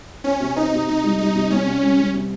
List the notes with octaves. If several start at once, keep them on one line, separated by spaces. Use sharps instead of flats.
C4 C#4
C3
C4 D#4
C3
C3 D#4
G3
G3 D#4
C3
C2 C#4
C3
G3
G3
C3